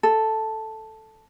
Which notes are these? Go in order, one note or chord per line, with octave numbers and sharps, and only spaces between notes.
A4